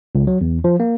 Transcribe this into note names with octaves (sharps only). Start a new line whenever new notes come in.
C#2
F#3
E2
F3
A#3